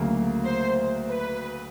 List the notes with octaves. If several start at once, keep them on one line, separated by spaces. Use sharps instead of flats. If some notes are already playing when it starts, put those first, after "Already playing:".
Already playing: D2 C#3 F#3 A#3
C5
B4